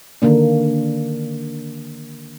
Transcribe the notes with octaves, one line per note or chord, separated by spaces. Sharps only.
D3 D#3 A#3 D4